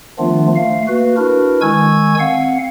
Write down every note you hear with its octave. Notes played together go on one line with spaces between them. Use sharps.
D#3 F3 A3 B3 D4 F4
A3 F5
A#3 F#4 B4
D4 E4 F#4 A#4 B4
D#3 G#3 G#5 C#6 E6 G#6
C4 F5 F#5